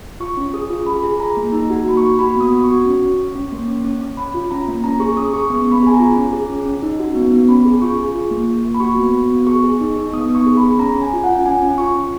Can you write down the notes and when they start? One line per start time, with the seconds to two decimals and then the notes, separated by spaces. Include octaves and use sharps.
0.20 F4 C#6
0.37 C#4
0.54 G#4 D#6
0.70 F4
0.86 G#4 B5
1.03 G#4
1.20 G#4 A#5
1.37 A#3
1.52 D#4 A#5
1.70 F#4
1.87 A#3 B5
1.97 C#6
2.03 A#3
2.19 F#4 B5
2.36 B3 D#6
2.52 F#4
2.64 C#6
2.69 F#4
2.85 C#4
3.02 C#4
3.18 C#4
3.35 C#4
3.52 A#3
3.67 C#4
3.85 C#4
4.01 C#4
4.17 C#4 B5
4.34 F4
4.51 C#4 A#5
4.68 A#3
4.84 C#4 A#5
5.00 G#4 C#6
5.16 C#4 D#6
5.33 G#4 C#6
5.50 B3 C#6
5.67 B3 B5
5.83 G#4 G#5
5.94 A#5
6.00 F4
6.16 C#4
6.33 G#4
6.50 C#4
6.65 C#4
6.83 D#4
6.99 F#4
7.15 B3
7.32 B3
7.48 C#4 B5
7.65 G#4
7.82 F4 C#6
7.99 G#4
8.15 F4
8.31 A#3
8.48 A#3
8.65 A#3
8.74 B5
8.80 F#4 C#6
8.97 B3
9.13 F#4
9.31 B3
9.47 G#4 C#6
9.64 G#4
9.80 D#4
9.97 D#4
10.13 B3 D#6
10.30 B3
10.35 C#6
10.46 G#4
10.57 B5
10.63 G#4
10.79 C#4 A#5
10.96 C#4
11.02 G#5
11.13 F4
11.24 F#5
11.29 F4
11.46 C#4 G#5
11.62 C#4
11.78 F4 C#6
11.95 C#4